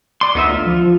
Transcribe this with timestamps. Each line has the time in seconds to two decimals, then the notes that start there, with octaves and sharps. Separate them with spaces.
0.21 D5 C6
0.35 D2 B3 D#4 E5
0.49 F4
0.66 F3